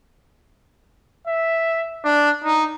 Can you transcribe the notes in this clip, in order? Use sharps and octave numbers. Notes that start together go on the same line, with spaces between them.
E5
D4
D#4